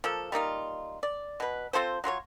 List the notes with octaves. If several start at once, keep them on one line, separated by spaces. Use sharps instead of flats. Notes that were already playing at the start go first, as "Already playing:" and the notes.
F3 A#3 A4
G3 A#3 D#4 F4
D5
B2 B4
C4 F4 A4 C5
F#3 F4 A#4 C#5